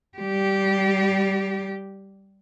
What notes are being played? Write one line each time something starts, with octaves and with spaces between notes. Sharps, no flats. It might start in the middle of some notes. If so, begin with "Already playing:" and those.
G3 G4